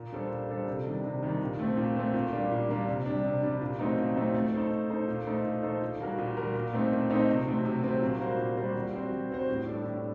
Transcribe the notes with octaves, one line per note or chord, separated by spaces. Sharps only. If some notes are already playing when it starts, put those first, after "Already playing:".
Already playing: A#2
G3 D4 A4 C5
A#2
G3 D4 A4 C5
C3
D#3 G3 D4
C3
D#3 G3 D4
A#2
A3 C4
A#2
A3 C4
A#2
G3 A#3 D4
A#2
G3 A#3 D4
C3
G3 D4
C3
G3 D4
A#2
F#3 A3 C4 D#4
A#2
F#3 A3 C4 D#4
A3
D#4 A4 C5
A3
D#4 A4 C5
A#2
A3 D#4 A4 C5
A#2
A3 D#4 A4 C5
A#2
G3 A#3 F#4 A#4
A#2
G3 A#3 F#4 A#4
A#2
A3 C4 D#4
A#2
A3 C4 D#4
C3
F#3 A3 C4
C3
F#3 A3 C4
A#2
G3 A#3 F#4 C5
A#2
G3 A#3 F#4 C5
G3
C4 F#4 C5
G3
C4 F#4 C5
A2
G3 D4 A4
A2